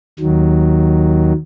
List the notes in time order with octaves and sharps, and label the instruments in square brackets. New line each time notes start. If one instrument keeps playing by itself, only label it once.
[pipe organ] D#2 D#3 F#3